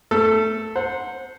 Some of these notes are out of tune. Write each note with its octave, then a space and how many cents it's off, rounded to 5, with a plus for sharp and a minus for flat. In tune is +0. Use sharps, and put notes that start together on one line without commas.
A3 +0 A4 +0 E6 +40
C5 +0 F#5 -20